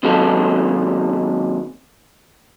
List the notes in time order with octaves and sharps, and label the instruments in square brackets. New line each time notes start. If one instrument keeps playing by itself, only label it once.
[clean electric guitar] D#2 C3 F#3 G#3 C#4 A4